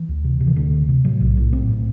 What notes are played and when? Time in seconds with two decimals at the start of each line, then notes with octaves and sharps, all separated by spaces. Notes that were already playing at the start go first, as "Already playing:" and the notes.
Already playing: E3
0.09 D2
0.24 C3
0.40 C3
0.47 E3
0.56 D2 D3
0.73 C3
0.89 C3
1.05 A2 F#3
1.21 B1
1.37 A2
1.53 A2 C4
1.69 A2